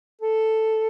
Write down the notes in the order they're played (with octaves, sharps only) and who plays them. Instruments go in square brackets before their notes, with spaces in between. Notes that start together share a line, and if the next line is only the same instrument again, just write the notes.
[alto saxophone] A4